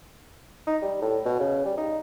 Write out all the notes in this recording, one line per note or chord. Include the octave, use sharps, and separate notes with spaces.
D#4
G3
A2
B2
C#3
G3
D#4